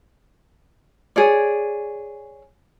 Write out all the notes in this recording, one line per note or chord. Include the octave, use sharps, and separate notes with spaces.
G#4 C#5 D5